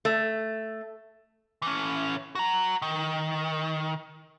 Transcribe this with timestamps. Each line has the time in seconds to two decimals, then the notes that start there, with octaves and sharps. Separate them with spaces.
0.05 A3
1.62 E3 C#4
2.35 F#4 A#5
2.82 D#3